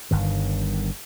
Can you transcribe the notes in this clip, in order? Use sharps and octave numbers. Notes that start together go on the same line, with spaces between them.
G1 G2 D#3